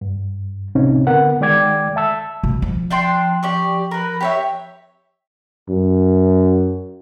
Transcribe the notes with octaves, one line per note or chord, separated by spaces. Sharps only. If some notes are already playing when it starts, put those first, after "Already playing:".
G2
C2 A2 C3 C4 C#4 D#4
D3 B3 A#4 F#5
D#3 G#3 D5 G5 D6 G#6
E5 A5 E6
B2
F3
D4 G5 C6
G4 D5 C#6
A#4 B4
G4 C#5 E5
F#2